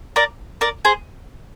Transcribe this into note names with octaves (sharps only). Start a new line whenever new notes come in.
A#4 D5
A#4 D5
G#4 C5